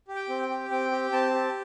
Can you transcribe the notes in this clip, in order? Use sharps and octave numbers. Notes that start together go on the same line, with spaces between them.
G4
G5
C4
G5
G4
C4 G5
G4
C4 A5
G4